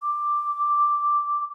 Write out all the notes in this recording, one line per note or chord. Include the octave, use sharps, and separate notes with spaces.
D6